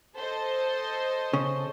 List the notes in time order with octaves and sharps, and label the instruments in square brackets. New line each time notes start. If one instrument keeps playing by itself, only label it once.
[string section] A4 C5 D#5
[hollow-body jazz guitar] C#3